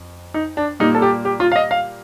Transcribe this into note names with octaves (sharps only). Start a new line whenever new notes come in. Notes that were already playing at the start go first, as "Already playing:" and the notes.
Already playing: F2
D#4
D4
A#2 G3 A#3 D#4
A4
G4
G4
F4
F5
D#5
F5